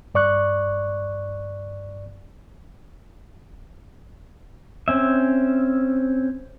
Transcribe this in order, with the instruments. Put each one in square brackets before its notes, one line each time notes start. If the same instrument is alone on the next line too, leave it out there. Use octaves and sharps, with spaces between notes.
[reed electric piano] G2 D5 C#6 F#6
[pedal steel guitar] C4 C#4 E5